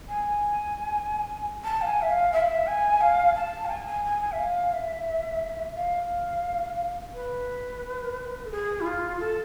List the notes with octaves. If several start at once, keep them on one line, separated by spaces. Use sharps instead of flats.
G#5
A5
F5
G#5
E5
F5
E5
F5
E5
G#5
F5
A5
F5
G#5
G#5
G#5
G#5
E5
F5
E5
F5
B4
A4
G#4
E4
F4
A4